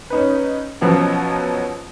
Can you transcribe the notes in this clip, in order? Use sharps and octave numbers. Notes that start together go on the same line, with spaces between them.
C#4 D#4 B4
B2 F3 F#3 B3 C#4